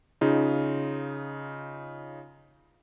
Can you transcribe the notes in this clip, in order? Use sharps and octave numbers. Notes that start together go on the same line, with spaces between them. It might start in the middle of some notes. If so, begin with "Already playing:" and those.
C#3 D#4 F4